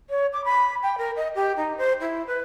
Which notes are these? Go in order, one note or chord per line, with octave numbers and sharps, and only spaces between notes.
C#5
D6
B5
G5
A#4
D#5
G4
D#4
C5
E4
B4